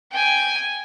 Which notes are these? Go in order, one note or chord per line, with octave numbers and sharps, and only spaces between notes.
G5 G#5